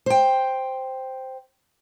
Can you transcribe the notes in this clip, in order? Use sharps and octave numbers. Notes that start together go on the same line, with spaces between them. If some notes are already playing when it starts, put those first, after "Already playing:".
C5 G5